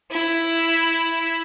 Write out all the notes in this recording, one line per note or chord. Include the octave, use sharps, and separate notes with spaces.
E4